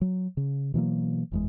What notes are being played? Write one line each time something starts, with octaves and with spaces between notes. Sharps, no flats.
F#3
C#3
B2 E3 F#3 A#3
F#1 E2 G#3